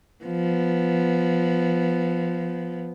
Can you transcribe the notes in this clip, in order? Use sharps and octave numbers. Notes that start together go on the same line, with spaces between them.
F3 B3